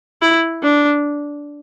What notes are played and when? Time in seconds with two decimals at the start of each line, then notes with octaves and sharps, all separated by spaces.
0.22 E4
0.62 D4